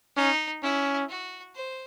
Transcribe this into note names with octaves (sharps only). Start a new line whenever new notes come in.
C#4 D#4
C#4 E4
F#4
C5